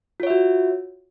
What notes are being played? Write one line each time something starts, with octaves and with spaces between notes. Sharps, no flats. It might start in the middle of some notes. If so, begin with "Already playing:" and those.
F4 F#4 C#5 E5